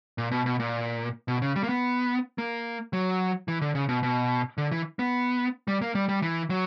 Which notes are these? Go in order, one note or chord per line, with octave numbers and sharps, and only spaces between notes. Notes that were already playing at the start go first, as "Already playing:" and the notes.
A#2
B2
B2
A#2
B2
C#3
G3
A#3
B3
A#3
F#3
E3
D3
C#3
B2
B2
D3
E3
B3
G3
A#3
G3
G3
E3
F#3